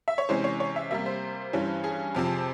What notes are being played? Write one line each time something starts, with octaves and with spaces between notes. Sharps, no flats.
E5
C#5
C3 E3 G#3 C#4 C5
C#5
C#5
E5
C3 G3 A#3 E5
C5
G2 E3 G3 C#4
G#4
F2 C3 F3 C4